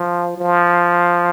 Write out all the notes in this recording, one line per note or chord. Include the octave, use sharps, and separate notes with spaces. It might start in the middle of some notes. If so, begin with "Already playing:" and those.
Already playing: F3
F3